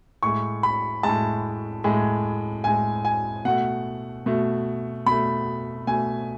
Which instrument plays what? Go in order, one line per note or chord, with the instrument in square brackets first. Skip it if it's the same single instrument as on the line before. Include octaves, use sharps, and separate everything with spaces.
[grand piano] A2 G#3 C#6
B5
A2 G#3 A5
A2 G#3
A2 G#3 G#5
G#5
B2 A3 F#5
B2 A3
B2 A3 B5
B2 A3 G#5